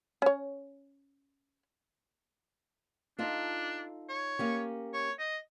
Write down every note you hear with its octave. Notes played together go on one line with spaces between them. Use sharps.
C#4 C#5
D4 D#4 F4 A4
C#5
A#3 C#4 G4
C#5
D#5